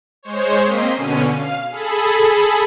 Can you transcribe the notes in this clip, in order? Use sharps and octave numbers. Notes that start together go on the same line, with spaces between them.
G#3 C5 C#5
A#3 C4 D#5 C6 B6 C7
B2 D3 C#4 D#7
F5
G#4 A4 B5